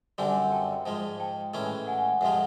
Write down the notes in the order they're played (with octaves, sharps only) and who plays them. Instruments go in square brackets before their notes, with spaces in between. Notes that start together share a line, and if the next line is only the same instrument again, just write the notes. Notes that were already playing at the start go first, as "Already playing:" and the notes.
[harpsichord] F#2 D3 G3 C4 [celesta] F#5 G#5
[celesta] G5 A5
[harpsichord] G#2 F3 G#3
[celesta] G5 A5
[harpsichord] A2 E3 G#3 C#4
[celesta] F#5 G#5
[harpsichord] F2 C3 F3 G#3 [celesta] E5 F#5